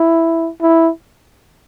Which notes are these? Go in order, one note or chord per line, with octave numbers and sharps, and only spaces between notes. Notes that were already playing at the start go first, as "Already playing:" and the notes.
Already playing: E4
E4